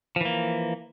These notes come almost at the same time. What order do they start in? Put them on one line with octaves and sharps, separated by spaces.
F3 E3 A#3